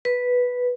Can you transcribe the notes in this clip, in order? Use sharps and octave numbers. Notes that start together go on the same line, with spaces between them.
B4